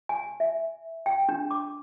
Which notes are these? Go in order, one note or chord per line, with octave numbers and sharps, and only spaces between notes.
G#5
E5
G5
D4
D6